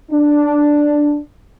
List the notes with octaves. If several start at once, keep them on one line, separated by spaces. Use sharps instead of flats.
D4